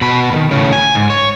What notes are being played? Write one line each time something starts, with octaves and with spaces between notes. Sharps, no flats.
B2 B5
D#2 D#3
A2 C#3
G#5
G#2
C#5